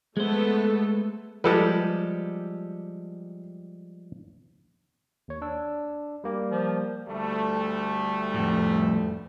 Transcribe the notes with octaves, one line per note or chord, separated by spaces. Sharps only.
G#3 A3 B3 A4 C5
F3 G3 G#3 G4 A4 B4
D#2 C#5
D4 E6
G3 A#3 G4
F3
D2 G3 A3
F2 A2